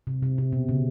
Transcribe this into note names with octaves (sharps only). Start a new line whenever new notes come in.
C3
C3
C3
B2
C#3